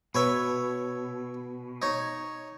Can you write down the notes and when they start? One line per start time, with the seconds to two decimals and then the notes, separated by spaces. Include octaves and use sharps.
0.15 B2 B4 C#5 E5
1.82 D#4 C#5